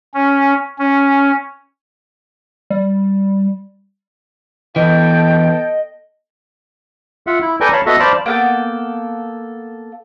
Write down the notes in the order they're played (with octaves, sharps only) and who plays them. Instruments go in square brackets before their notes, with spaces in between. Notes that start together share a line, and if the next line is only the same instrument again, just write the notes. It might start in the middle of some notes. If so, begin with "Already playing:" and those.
[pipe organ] C#4
C#4
[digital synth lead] G3
[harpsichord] B2 [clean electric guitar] E3 [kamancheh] A4 G5 [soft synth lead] D#5
[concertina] F4 E5 F#5
E4
A4 B4 D5 G5 G#5 A#5
C#5 F5 A5 B5
B3 F#4 A4 D#5 E5
C5 D5 F5 A5 B5
[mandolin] A#3 B3 A4 G5